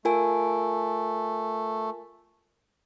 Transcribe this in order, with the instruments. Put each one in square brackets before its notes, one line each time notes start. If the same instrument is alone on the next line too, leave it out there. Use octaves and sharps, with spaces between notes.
[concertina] A3 [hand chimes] F4 A#4 G#5